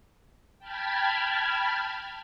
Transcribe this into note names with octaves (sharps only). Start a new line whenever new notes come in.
G5 A5 B5 F6 G#6